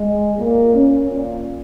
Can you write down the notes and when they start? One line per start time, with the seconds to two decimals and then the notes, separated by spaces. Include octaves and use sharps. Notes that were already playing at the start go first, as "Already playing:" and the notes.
Already playing: G#3
0.39 A#2 A#3
0.75 C#4
1.10 A#2